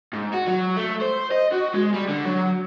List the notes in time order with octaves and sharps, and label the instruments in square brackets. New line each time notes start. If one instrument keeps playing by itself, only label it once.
[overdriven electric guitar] G#2
F#4
F#3
A3
C5
D#5
F#4
G#3
G3
D3
F#3